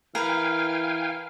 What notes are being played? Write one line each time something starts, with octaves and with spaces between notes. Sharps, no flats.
E3 A#4 B4 F5 G5 G#5 F6